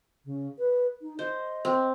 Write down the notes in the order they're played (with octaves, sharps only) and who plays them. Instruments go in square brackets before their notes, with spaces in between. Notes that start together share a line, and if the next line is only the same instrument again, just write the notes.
[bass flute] C#3
B4
D#4
[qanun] C5 [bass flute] D#5
[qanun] C4